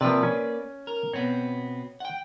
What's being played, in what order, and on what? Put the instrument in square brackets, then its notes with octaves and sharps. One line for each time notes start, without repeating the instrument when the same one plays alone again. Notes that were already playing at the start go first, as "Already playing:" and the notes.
[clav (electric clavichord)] C3 F3 [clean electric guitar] A#3 B4 D5
[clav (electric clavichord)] C#4 G#5
[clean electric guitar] A#4
[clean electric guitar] B2 B3 C4 [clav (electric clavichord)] C#5
[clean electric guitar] F#5 G5